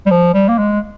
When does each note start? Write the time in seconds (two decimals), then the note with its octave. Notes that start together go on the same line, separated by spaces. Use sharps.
0.06 G3
0.11 F3
0.34 G3
0.49 A#3
0.58 G#3